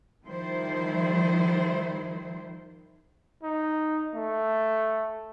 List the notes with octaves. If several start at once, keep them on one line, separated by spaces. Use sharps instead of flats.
D#3 F3 G3 E4 C5
D#4
A3